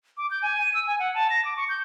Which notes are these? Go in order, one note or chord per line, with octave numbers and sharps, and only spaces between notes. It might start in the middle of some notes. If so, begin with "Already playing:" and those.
D6
G6
G#5
D#7
E6
G#5
F#5
A5
A#6
D6
C#6
G6